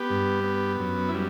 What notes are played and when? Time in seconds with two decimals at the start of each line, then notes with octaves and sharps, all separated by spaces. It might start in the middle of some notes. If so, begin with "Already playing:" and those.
Already playing: B3 G4
0.10 G2
0.44 B3
0.79 F#2
1.08 E4
1.14 G3